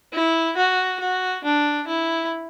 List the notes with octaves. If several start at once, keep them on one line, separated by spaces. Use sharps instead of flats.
E4
F#4
F#4
D4
E4